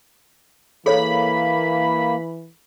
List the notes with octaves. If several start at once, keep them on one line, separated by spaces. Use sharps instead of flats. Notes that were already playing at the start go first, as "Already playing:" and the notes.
E3 A#3 G#4 A4 C#5 B5